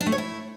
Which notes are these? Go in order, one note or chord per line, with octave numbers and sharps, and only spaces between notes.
D4
A3
C#5
E4